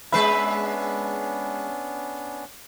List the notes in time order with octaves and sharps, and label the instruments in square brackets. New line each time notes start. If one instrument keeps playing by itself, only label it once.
[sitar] G#3 B4 E5 [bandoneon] B3 C#4 D4 [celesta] B5 C7